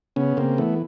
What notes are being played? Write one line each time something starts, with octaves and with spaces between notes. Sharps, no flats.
C#3 B3 C#4
C#3 A#3 C4
E3 A3 B3